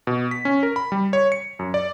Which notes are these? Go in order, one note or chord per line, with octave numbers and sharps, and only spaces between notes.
B2
B6
C#4
A#4
B5
G3
C#5
C#7
F#2
D5